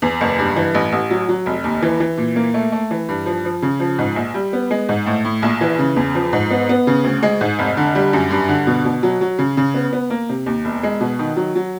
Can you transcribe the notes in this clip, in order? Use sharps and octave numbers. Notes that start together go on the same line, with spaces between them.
E2
F#1
G2
E3
A1
A1
F#3
F#3
F1
D#2
E3
E3
A#2
A#3
A3
A3
E3
G2
F3
F3
C#3
F3
G#2
A#1
G3
B3
G#3
G#2
A2
A2
A#1
E3
C#3
E2
F3
G#2
B3
B3
C#3
D2
G#3
G#2
F1
D3
G3
F#2
G2
D3
B2
B2
F#3
F#3
C#3
C#3
B3
B3
A#3
C3
D#2
E1
G#3
B2
D#3
F#3
F#3